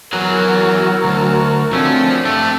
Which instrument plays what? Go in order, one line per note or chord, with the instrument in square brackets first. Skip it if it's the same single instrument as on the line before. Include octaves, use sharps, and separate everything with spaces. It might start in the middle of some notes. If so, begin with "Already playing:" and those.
[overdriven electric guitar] E3 G#4 [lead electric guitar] F#3 [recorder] F#4 [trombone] A#4
[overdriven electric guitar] D2
[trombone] D3 [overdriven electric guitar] F3 [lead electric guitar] A3 C#4 [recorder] C4
[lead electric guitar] A3 [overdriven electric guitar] D4 G4